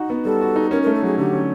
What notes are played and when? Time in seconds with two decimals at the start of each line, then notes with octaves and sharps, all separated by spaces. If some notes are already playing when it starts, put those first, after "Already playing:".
Already playing: D#4 F#4
0.10 B3
0.25 G3 A4
0.41 F#4
0.56 D#4
0.71 C#4 A#4
0.82 A3 A#4
0.95 A4
1.03 F#3 G#4
1.18 D3 G4
1.33 C#4